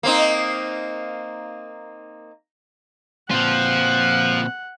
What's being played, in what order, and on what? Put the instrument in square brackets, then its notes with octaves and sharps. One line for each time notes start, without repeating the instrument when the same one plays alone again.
[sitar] A#3 C4 D#4
[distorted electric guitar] A#2 C4 [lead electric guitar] F3 F4 [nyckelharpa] F#5